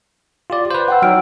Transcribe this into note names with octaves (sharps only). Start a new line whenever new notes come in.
F4 G4 D5
B4 C5
F#5 G5 E6
F#3 D#4 F6 D7